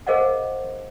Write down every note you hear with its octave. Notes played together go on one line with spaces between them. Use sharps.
G#4 A#4 C5 D#5 F5 F#5